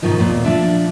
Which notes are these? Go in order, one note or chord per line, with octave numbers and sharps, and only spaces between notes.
G#2 B2 D#3 F3 D#4
D#2 A#2 B3
F3 D4 E5